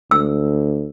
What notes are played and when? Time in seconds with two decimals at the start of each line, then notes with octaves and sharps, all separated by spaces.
0.11 D2 E6